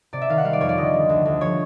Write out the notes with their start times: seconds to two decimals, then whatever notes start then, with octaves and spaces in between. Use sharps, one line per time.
0.13 C3 D5
0.21 E5
0.29 D#3 F5
0.38 F#5
0.44 G3 F5
0.53 D5
0.61 F2 C#5
0.69 D5
0.77 D3 D#5
0.94 G3
1.09 D2
1.25 D2
1.41 F3 C#5